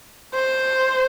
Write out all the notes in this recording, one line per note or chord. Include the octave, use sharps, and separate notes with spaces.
C5